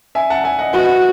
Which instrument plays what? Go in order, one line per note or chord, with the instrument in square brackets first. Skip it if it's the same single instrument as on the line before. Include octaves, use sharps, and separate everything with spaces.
[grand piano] E5 G#5
F#5 A5
E5 G#5
D#5 F#5
[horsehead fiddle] F#4 [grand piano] B4 D#5